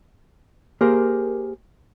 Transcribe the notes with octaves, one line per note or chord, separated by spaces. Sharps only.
A#3 G4 G#4 A#4 C5